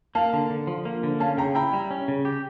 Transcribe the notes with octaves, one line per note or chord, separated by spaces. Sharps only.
A#3 F5 A5
D3
D3
F3
A#3
D3
C#4 F5 A5
C#3 G5 A#5
E4 G5 A#5
G3
C#4
C#3
G4